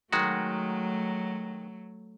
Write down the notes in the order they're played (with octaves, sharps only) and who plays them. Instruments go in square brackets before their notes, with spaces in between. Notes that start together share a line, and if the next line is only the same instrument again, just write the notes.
[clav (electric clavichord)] D#3 G#3 F#4 [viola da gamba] F#3 A3